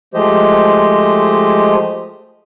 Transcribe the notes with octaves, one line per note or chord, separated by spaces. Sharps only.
F3 G#3 A3 G4 C5 D#5